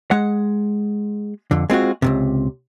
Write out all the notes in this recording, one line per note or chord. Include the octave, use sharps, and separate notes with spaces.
G#3 F#5
F2 D3
G#3 C4 F4 F#4
C#2 G2 C3